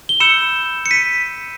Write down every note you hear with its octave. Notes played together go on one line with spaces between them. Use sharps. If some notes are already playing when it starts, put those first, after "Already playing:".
G7
B5 E6 G6 C#7 E7
C#7
B6 D#7